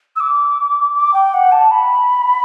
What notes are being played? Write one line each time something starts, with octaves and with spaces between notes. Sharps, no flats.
E6
D6
D6
G5
F#5
A5
B5